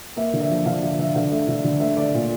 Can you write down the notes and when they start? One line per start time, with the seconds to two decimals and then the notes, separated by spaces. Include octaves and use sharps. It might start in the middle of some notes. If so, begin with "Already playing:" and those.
0.16 A#3 E5
0.33 D3
0.41 E5
0.50 F3
0.66 D3 F5
0.82 F3 E5
0.99 D3 E5
1.15 D3 F5
1.31 A3 E5
1.48 D3 E5
1.64 D3
1.80 A3 E5
1.97 A3 D5
2.14 A#2